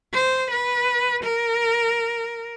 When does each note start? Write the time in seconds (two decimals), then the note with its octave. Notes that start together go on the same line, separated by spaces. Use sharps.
0.13 C5
0.50 B4
1.23 A#4